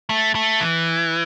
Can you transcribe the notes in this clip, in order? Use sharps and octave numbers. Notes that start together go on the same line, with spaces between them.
A3
A3
E3